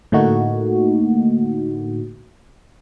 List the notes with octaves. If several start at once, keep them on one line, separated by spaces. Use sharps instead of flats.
A2 D3 A3 A#3 D#4 F#4